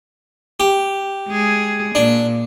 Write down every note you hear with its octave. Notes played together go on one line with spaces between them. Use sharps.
G4
G#3 G#4
A#2 D4